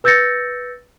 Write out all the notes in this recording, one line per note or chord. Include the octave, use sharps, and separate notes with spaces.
B4 E6 G6 A6 A#6 C#7